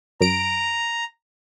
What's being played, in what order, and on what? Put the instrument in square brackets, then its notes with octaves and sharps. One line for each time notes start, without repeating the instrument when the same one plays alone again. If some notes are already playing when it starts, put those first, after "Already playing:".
[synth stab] F#2 D7 [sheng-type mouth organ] A#5